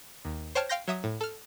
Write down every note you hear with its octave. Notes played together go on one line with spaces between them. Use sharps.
D#2
C5 C#5 G5 A5 F6
F5 G5 C6 G6 A#6
F#3 E5 D#6
A2
A4 F6